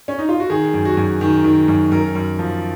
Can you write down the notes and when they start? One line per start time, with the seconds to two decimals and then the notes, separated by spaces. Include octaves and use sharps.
0.08 C#4
0.19 D#4
0.29 F4
0.40 F#4
0.50 D#3 G#4
0.74 F#2
0.85 F#4
0.97 F#2
1.21 D#3
1.44 D#3
1.68 F#2
1.92 F#2 A#4
2.15 F#2
2.39 F3